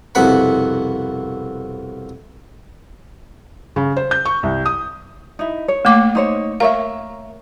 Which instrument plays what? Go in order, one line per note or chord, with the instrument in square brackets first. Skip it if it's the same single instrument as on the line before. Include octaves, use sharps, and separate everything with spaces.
[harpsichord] C2 F2 B2 F#5 B5
[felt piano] C#3
C5
G6
C#6
C2
D#6
[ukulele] D#4 E4
C#5
[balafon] A3 A#3 D6
[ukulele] D#4 C5 C#5
[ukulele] A#4 C#5 E5 [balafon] F5